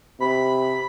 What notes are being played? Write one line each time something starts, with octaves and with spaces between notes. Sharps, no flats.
C3 B5